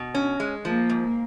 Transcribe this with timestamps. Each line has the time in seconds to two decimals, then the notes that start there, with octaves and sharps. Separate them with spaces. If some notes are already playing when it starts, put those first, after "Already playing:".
Already playing: B2
0.14 C#4
0.40 G#3
0.65 F3 A#3
0.90 G#2